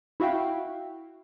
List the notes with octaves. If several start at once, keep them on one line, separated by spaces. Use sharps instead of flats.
E4 F#4 E5 F5 G5